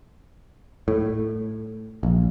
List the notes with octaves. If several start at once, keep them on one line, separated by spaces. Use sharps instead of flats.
A2
A#1